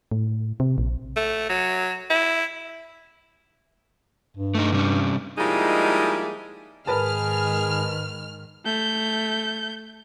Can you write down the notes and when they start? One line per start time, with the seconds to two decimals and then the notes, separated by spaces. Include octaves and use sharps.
0.12 A2
0.60 C3
0.78 A#1
1.17 A3
1.50 F#3
2.10 E4
4.37 G2
4.55 A3 D#4
4.72 C3 G3 C#4
5.38 F3 G3 G#3 A#3 D#4 E4
6.87 G#2 D#3 G#4 A#4 B4 A5 F6
8.65 A3 G6